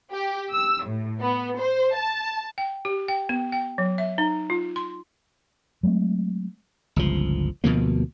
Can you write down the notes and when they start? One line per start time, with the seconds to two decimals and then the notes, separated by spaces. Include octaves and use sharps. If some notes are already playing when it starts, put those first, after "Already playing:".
0.12 G4
0.52 E6
0.86 A2
1.21 B3
1.59 C5
1.95 A5
2.58 G5
2.85 G4
3.08 G5
3.29 B3
3.52 G5
3.78 F#3
3.98 E5
4.18 D#4
4.50 F4
4.76 C6
5.83 F#3 G#3 A3 C4
6.96 G1 C#2 F3
7.64 D2 B2 F3 A#3